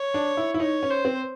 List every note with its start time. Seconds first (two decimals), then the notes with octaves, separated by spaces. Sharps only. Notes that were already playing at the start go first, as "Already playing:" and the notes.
Already playing: C#5
0.14 D4
0.37 E4
0.54 E4
0.60 D#4 C#5
0.83 C#4
0.90 C5
1.05 C4